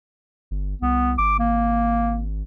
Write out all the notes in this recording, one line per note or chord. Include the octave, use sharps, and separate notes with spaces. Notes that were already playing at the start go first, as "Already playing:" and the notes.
G1
C2 B3
G#1 D6
A#3